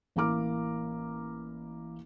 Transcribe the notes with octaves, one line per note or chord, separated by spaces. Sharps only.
A1 A#3 E4 A#5 D6 F6